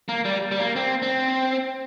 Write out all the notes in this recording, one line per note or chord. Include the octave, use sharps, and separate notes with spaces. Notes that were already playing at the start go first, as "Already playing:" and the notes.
A#3
G3
G3
A#3
C4
C4